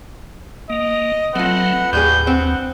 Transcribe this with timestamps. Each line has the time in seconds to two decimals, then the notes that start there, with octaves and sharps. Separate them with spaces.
0.70 A#3 D#5
1.35 F#3 A3 C4 F4 B4 F#5
1.93 D#2 A2 G3 G#4 G6
2.27 C4 F#5